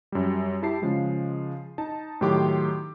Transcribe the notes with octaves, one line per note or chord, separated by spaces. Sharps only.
F#2 G3
E4 G4 A5 C7
C#3 F3 G#3
D#4 A5
A2 D#3 F#3 G4 C6 D6